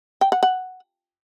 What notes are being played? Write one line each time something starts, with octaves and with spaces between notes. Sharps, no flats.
G5
F#5
F#5